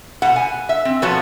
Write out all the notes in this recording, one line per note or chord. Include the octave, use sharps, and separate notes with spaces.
B2 F#5
G#5
E5
C4
B2 F3 B3 F#4 C#5 A5